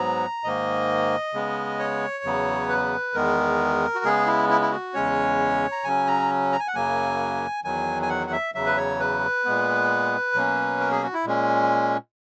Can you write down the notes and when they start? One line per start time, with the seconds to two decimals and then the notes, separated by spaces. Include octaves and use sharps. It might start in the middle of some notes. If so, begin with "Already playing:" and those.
Already playing: G#2 F#3 B3 A#5
0.44 G#2 D#3 A#3 D#5
1.34 C#3 G#3 B3
1.79 C#5
2.24 E2 C#3 F#3 B3
2.69 B4
3.14 E2 D#3 G#3 B3 A#4
3.95 F#4
4.04 C#3 G#3 B3 G#4
4.27 E4
4.49 E4
4.61 E4
4.72 F#4
4.94 E2 C#3 G#3 C#4 C#5
5.72 A#5
5.84 C#3 F#3 C#4 G#5
6.07 A#5
6.52 A#5
6.60 G#5
6.68 F#5
6.75 F#2 C#3 F#3 A#3 G#5
7.64 E2 D#3 F#3 G#5
8.02 G#5
8.09 F#5
8.27 F#5
8.32 E5
8.55 E2 C#3 F#3 E5
8.66 B4
8.77 C#5
9.00 B4
9.45 A#2 G#3 B3
10.35 B2 F#3 A#3 C#4
10.80 A#4
10.91 G#4
11.03 F#4
11.14 E4
11.25 A#2 G#3 C#4